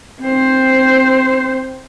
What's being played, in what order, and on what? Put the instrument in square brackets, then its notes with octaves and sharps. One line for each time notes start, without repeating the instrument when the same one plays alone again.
[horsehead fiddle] C4 C5